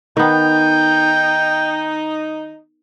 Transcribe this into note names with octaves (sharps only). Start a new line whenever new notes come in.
D#3 B3 D#4 G5